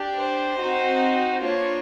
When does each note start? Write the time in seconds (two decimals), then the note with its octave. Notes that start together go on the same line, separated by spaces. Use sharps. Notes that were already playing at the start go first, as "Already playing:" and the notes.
Already playing: D4 G4
0.19 C5
0.60 C4 D#4 F#4
1.42 A#3 D4 F4 C#5